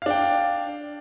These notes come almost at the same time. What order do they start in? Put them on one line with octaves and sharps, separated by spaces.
F5 D4 G5